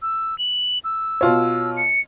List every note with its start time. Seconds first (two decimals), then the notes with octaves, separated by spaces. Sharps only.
0.02 E6
0.38 F#7
0.84 E6
1.21 B2 F4 C#5
1.77 C#7